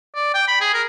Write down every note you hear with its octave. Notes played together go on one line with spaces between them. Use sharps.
D5
G5
B5
G#4
A#4